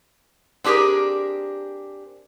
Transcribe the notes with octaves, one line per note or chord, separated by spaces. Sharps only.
C4 D4 G4 G#4 A#4